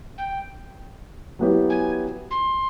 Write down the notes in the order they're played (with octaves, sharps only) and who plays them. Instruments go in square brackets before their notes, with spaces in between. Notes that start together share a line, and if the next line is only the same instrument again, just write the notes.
[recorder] G5
[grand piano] F#3 B3 E4 G4 B4
[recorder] G#5
C6